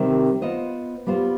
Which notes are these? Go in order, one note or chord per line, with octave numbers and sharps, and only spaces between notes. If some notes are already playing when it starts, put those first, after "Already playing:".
Already playing: C3 D#3 G3 C4
B3 F4 C5 D#5
G3 B3 F4 C5